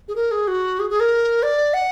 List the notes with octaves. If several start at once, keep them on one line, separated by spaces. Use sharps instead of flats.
G#4
A#4
G#4
F#4
G#4
G#4
A#4
D5
F#5